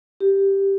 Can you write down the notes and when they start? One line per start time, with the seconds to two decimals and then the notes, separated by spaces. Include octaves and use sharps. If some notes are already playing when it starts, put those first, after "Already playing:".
0.20 G4